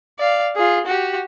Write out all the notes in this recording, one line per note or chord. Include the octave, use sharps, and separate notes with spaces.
D5 F5
F4 G#4
F#4 G4